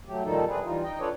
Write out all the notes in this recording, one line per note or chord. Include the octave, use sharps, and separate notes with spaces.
F#3 A3 G4
A#2 D#3 F3 G3 D#4 A4
G2 C3 C4 D4 G#4 B4
E3 G3 D#4 F4
D#4 D#5 G5
D4 F4 A4 B4 C#5 D5